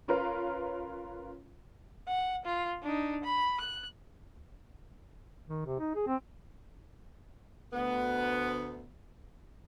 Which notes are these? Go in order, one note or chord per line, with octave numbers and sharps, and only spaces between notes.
C#4 F4 A#4 B4
F#5
F4
D4 D#4
B5
F#6
D#3
C3
D#4
G#4
C4
D2 B3